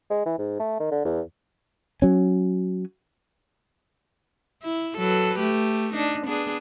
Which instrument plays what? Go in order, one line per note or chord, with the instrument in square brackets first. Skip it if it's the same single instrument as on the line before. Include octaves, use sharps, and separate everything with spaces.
[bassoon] G#3
E3
G#2
A3
D#3
D3
E2
[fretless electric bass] F#3 C#4
[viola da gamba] E4
F#3 A4 B4
A3 G4
D4 D#4
B3 D4 G#4